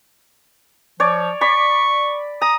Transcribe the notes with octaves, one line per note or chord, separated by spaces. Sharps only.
F3 C#5 D5
D5 B5 C#6
A#5 D#6